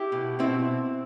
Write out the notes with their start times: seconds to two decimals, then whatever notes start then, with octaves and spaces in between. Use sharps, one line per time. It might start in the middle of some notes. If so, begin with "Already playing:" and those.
Already playing: E4 G4
0.12 B2
0.39 B2 C4 E4